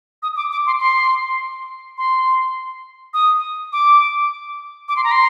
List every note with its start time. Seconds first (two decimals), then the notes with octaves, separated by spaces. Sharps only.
0.23 D#6
0.37 D6
0.52 D6
0.66 C6
0.80 C6
1.98 C6
3.14 D#6
3.73 D6
4.89 D6
4.97 C6
5.04 A#5
5.12 C6